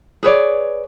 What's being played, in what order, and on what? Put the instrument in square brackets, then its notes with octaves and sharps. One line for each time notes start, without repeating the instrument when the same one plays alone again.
[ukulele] G#4 B4 C#5 D5